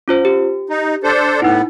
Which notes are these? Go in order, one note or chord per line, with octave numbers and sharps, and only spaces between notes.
C#4 F4 C5
G4
D#4
D4 A4 C5
A2 B3 D#4 E4